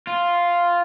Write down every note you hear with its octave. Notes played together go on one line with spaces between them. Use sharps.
F4